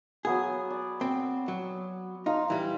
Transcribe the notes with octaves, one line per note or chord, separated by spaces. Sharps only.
F#3 B3 G#4 G#5
D5
C4
F#3
D#4 F4 A#5
E3 G3